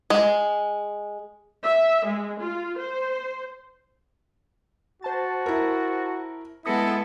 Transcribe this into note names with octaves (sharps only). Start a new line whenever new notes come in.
G#3
E5
G#3
F4
C5
F#4 C5 A5 A6
E4 A#4
G#3 B3 E4 A4 D#6 A#6 C#7